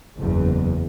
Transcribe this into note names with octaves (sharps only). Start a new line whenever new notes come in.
F#1 E2